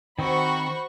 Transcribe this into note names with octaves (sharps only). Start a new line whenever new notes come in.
D#3 C4 F#4 C5 B5 C#6